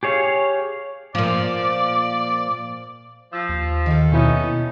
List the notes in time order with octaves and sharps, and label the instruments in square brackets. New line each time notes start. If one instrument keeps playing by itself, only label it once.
[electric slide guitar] G4 G#4 C#5 D#5 F5
[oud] A#2 F3 [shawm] D5
[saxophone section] F3 [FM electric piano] E6
[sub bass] D#2
[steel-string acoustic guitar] D#3 A4
[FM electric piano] B2 E4 [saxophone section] B3 C#4 D#4